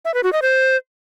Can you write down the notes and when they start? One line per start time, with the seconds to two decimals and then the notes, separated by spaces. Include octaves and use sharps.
0.05 E5
0.14 B4
0.23 F#4
0.33 D#5
0.42 C5